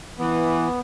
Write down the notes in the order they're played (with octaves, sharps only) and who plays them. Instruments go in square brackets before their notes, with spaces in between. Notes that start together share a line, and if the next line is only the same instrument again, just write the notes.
[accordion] E3 [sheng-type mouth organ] B3